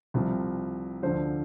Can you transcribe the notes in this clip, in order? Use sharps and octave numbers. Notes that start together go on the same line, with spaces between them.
C2 C3 F3
D2 D3 F3 C5